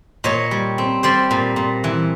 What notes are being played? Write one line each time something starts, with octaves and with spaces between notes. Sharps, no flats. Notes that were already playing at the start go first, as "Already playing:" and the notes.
A#2 C#5 D#5
G3
C4
G3 C5 D5
A#2
A#2
E3